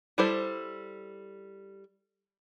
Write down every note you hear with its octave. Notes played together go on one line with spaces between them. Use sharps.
G3 E4 A4 C5